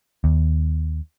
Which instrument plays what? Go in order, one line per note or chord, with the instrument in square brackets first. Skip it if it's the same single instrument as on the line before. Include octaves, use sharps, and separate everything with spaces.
[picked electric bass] D#2